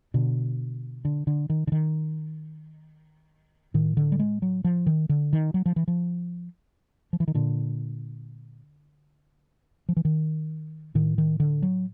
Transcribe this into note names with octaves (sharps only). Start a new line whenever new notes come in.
B2 D3
D3
D3
D#3
D3
D#3
A2 D#3
D3
G3
G#3
F#3
F3
D#3
D3
D#3
F#3
F3
E3
F3
F3
E3
D#3
A#2 D3
F3
E3
D#3
A2 D#3
D#3
D3
F#3